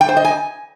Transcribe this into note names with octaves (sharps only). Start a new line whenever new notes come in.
G5
C5
D#5
G#5